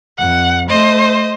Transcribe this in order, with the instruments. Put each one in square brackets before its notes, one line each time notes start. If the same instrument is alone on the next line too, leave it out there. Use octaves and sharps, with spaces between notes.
[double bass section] F2 [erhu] F#5
[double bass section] A3 [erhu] C5 [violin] D#5